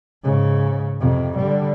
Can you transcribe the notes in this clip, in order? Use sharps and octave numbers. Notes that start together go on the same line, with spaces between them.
G#2 C#3
F2 C3
D3 G3